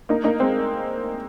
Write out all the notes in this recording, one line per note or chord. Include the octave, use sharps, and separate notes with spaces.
A#3 D#4
A#3 D#4
G#3 C4